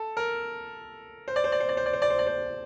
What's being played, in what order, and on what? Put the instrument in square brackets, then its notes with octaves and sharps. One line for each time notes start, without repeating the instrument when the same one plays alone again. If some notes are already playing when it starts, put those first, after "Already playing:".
Already playing: [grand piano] A4
A#4
C5
D5
C5
D5
C5
D5
C5
D5
C5
D5
C5
D5
C5